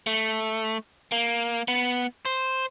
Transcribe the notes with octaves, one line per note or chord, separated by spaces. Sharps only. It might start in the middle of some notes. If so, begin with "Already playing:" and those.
A3
A#3
B3
C5